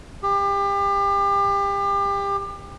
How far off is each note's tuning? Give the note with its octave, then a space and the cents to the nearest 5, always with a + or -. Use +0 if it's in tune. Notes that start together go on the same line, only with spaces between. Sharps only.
G4 +30